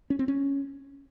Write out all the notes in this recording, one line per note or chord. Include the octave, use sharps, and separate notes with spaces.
C#4
C4
C#4